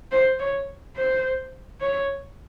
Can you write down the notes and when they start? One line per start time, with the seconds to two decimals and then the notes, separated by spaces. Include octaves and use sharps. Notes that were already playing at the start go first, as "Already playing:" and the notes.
0.12 C5
0.40 C#5
0.96 C5
1.81 C#5